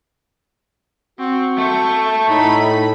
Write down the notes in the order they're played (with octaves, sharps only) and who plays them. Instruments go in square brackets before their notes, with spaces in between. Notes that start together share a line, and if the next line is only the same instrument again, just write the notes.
[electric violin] C4 [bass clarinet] F#4
[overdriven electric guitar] A3 [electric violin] C#6 G6
[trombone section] A2 [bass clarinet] D#4 [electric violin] B5